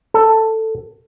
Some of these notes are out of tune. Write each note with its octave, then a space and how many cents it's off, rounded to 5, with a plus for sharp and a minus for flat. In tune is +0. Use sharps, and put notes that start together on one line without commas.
A4 +10